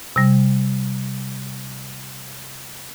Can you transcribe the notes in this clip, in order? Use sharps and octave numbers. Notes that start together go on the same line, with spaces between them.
C3 G3